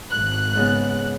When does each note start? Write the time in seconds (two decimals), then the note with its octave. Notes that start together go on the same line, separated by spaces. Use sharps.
0.11 G#1 F#6
0.55 G#2 C#3 B3